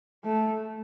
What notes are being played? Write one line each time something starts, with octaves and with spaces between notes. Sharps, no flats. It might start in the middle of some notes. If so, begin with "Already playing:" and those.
A3